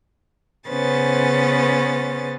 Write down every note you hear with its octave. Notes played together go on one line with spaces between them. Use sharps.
C#3 B3 C#4 B4 C5 A6